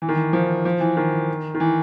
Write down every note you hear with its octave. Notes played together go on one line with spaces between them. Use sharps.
E3
D#3
E3
F3
F3
E3
D#3
D#3
E3